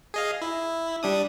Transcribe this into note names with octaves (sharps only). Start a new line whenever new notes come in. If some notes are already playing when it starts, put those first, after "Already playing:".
G#4 D#5 F5
E4
G3 D4 D#6